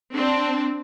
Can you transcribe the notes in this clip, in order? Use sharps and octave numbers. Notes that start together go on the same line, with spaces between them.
C4 D4